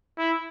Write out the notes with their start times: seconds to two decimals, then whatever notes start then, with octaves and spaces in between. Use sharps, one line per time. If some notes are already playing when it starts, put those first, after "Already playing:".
0.18 E4